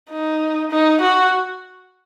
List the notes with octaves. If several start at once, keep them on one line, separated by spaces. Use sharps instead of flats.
D#4
D#4
F#4